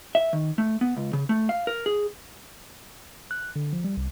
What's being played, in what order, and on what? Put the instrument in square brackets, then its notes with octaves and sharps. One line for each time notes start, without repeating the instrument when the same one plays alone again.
[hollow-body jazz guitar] E5
D#3
A3
B3
C#2
C#3
A3
F5
A#4
G#4
[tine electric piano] F#6
D3
F3
G3
C2